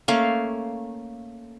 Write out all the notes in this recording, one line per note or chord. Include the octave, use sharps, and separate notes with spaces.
A3 A#3 C#4 F5